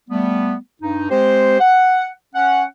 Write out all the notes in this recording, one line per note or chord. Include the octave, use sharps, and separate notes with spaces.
G3 A3 B3
G2 D#4
G#3 C4 G4 C5
F#5
C#4 F#5